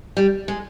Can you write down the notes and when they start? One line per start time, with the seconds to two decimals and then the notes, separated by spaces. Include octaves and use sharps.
0.17 G3
0.48 G#3